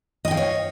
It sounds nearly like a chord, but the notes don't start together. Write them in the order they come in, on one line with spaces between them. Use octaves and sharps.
D#5 G#5 G5 F5 C#5